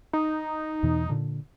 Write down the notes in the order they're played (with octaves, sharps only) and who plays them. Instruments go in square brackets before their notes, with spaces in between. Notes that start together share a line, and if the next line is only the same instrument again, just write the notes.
[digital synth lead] D#4
[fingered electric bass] E2 B2 E3
A#2 D3